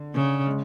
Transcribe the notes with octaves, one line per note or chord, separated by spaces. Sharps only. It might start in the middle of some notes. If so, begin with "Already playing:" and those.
Already playing: D3
C#3
G#3